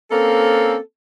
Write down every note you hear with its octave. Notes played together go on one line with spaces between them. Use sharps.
A#3 C4 C#4 A4